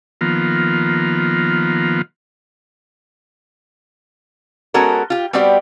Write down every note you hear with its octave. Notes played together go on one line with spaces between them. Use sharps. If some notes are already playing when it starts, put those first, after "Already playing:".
D#3 F3 A#3 B3 F4
G#3 B3 C#4 F#4 A4 A#4
F4 G4
G3 B3 C4 F#4 G4 D5